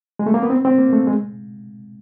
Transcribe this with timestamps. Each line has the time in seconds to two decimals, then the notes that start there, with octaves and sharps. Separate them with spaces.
0.19 G#3
0.26 A3
0.34 A#3
0.43 B3
0.50 C4
0.65 C4
0.78 A#3
0.93 A3
1.07 G#3